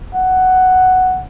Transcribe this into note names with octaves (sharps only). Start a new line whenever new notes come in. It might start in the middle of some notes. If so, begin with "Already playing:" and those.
F#5